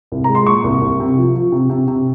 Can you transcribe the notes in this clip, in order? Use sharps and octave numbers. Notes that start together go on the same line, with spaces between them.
C2
G#3 A#5
C6
A#2 C#6
C2
C2
C3
F3
F3
C3
C3
C3